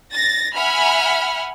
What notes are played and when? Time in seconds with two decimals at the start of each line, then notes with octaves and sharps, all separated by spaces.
0.14 A6 A#6
0.56 E5 F#5 G#5 B5 F6